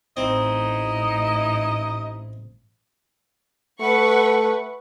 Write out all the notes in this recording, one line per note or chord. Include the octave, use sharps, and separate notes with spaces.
A1 C4 D#4 E4 D#5
A3 B4 F#5 C#6